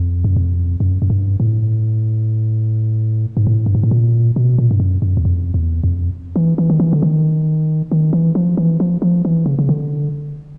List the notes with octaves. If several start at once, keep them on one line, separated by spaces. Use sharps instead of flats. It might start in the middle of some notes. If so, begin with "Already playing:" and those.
Already playing: F2
F#2
F2
F#2
F#2
G2
A2
G#2
A2
G2
G#2
A2
A#2
B2
A#2
G2
F#2
F#2
E2
F2
E2
F2
E3
E3
D#3
E3
D3
D#3
D#3
E3
F3
E3
F3
F3
E3
C#3
C#3
D3